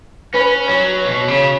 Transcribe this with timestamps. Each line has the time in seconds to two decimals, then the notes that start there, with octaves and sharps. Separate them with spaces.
0.34 C#4 B4
0.69 F#3 C#5
1.05 B2
1.28 C#3